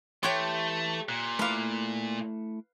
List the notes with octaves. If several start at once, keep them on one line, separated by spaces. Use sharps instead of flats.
E3 A3 G4 C#5 G5 C6 F#6
A#2 F#6
A3 E4 B4 F5 D6